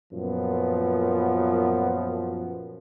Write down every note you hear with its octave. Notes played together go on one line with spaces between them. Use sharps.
F#2 A#2 F3 B3